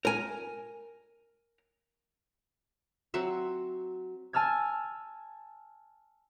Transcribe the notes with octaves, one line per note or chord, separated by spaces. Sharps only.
A#4 G#5
F#3 C4 F#4 E5
G#5 A5 E6 F6 G#6